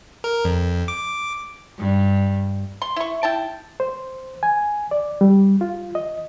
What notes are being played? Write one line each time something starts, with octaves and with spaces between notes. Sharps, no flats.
A#4
F2
D6
G2
C6
E4 C#6
E4 G5 A5
C5
G#5
D5
G3
F4
D#5